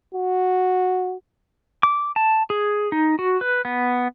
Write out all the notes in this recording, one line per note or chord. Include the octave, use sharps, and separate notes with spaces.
F#4
D6
A5
G#4
D#4
F#4
B4
B3